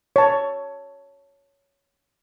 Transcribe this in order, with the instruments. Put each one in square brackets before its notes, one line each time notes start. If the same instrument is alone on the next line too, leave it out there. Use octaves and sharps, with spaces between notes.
[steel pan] C#5 A5